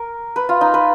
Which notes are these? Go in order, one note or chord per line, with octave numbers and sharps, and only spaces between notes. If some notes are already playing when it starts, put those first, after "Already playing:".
Already playing: A#4
B4
F4
D#4
B4